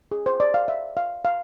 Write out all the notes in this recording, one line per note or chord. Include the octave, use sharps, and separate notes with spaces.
G#4
C5
D5
F5
E5
F5
F5